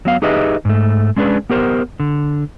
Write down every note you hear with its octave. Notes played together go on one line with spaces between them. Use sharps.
F#3 B3 F5
D#4 G4 G#4 B4 D#5 E5
G#2 A3
G#3 C#4 D4 G#4 B4
B3 G4 A#4 C5
D3